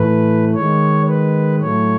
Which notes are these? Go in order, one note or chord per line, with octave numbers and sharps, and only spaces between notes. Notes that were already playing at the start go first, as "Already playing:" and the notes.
Already playing: A2 E3 A3 B4
D#3 G#3 C#5
B4
A2 F#3 A3 C#5